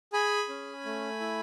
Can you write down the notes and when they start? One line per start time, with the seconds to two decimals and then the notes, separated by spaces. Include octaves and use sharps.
0.13 G#4 G#5 B5
0.49 C#4
0.85 A3
1.20 E4